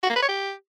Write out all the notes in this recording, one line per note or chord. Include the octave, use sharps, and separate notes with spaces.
F#4
A#3
B4
C#5
G4